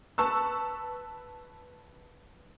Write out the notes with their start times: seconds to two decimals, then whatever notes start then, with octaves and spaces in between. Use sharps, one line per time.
0.18 B4 A5 C#6 E6